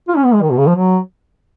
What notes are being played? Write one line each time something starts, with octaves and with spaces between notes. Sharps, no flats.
F4
C#4
B3
G#3
D#3
B2
C#3
F3
F#3